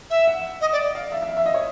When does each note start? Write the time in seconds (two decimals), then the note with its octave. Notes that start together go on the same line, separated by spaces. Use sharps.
0.10 E5
0.28 F#5
0.61 D#5
0.72 D5
0.95 F5
1.12 E5
1.22 E5
1.29 F5
1.37 E5
1.46 D#5
1.54 C#5